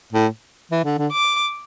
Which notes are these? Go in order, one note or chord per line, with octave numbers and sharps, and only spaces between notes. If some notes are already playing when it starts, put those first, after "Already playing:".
A2
E3
D3
D3
D6